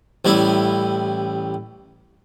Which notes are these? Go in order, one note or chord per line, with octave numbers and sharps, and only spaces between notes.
A1 G3 E4